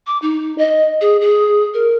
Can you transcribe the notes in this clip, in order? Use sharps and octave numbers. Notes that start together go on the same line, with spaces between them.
D6
D#4
D#5
G#4
G#4
A#4